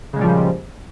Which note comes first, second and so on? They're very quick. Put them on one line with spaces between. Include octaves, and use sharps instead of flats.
C#3 G#3 A#2 G3 F3